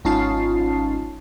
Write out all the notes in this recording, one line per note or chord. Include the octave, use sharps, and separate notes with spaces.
G#1 C#4 D#4 F4 A5 C7